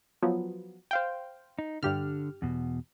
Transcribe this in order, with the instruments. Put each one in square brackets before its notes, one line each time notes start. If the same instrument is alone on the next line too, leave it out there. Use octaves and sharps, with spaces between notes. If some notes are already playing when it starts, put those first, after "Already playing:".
[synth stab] F3 F#3 B3
C5 F5 G5
[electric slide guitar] D#4
[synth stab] G2 G4 F6 [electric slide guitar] D3
[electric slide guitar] E2 B2